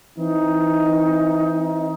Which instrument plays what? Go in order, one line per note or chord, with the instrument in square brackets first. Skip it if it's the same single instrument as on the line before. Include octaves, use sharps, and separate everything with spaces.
[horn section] E3 C4 D#4